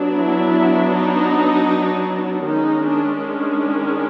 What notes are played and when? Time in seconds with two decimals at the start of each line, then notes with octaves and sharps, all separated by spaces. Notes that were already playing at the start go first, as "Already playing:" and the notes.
Already playing: F#3 B3 D4
0.16 E4
0.92 D#4
2.45 D#3 G#3 C#4 D#4
2.83 D4
3.21 D4